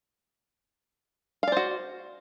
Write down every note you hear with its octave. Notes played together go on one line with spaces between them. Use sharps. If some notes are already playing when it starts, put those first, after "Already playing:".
F#4 C5 D5 F5